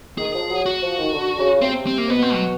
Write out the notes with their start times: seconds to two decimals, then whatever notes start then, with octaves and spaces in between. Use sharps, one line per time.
0.18 D#3 G#4
0.34 F3
0.50 F#3
0.66 F#4
0.82 F3
0.98 D#3
1.14 D3
1.38 C#3
1.61 C3 C4
1.87 C4
1.98 A#3
2.09 B2 B3
2.22 C4
2.34 F#3